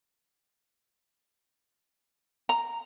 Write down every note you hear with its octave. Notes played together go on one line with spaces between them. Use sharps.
A#5